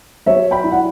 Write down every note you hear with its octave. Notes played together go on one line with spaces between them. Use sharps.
F#3 C#5 E5
G5 B5
E4
F#5